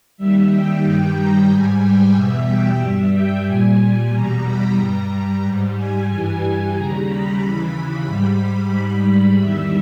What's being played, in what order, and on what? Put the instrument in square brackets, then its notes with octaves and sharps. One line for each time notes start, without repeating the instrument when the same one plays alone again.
[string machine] D#2 D#3 G3 E5
G5
G2 D#3 G3 G5
A#5
G#2 G3 G#5
G5
E2 B2 G3 E5
G5
G2 G3 E5
G5
A#2 G3 G#5
E2 B2 G3 A#5
B5
G2 G3 A#5
G#2 G3
G#5
G2 E3 G3
D#2 C#3 G3 A#5
B5
D#2 C#3 E3 B5
B5
G#2 G3
G#2 G3 B5
E2 D#3 G3 E5